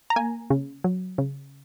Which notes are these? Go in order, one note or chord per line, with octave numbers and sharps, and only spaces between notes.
A#5
A#3 G#5
C#3
F#3
C#3